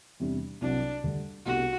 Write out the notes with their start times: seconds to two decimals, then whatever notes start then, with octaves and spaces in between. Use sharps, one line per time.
0.20 E2 C3 G3 D4
0.61 C2 C3 F#3 C4 D4 F#4
1.04 D2 D3 G3
1.46 C2 B2 A3 D4 F#4 G4